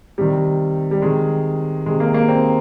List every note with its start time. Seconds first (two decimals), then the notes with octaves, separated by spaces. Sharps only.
0.18 C3 D#3 G3
0.91 G3
1.02 C3 D#3 G#3
1.86 C3 D#3 G#3
2.00 A#3
2.14 A#3
2.29 C4